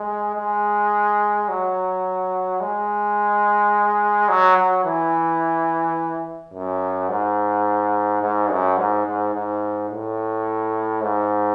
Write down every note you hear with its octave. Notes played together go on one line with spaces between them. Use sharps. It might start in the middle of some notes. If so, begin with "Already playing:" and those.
Already playing: G#3
G#3
F#3
G#3
F#3
F#3
E3
F#2
G#2
G#2
F#2
G#2
G#2
G#2
A2
G#2